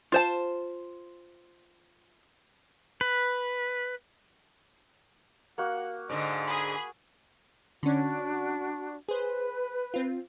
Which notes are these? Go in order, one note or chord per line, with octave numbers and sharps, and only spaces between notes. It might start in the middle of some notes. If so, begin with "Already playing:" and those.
F4 C5 A5
B4
A#3 F#4 F#5
G#2 D3 D#5
G#4 B5
D3 C#4 D4 F#4
G#4 B4 C5
C4 F4